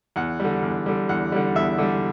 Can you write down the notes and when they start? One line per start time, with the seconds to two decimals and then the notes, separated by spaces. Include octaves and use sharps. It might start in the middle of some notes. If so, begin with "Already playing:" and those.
0.16 E2 F#5
0.40 D3 G3
0.63 E2
0.86 D3 G3
1.09 E2 F#5
1.32 D3 G3
1.55 E2 E5
1.78 D3 G3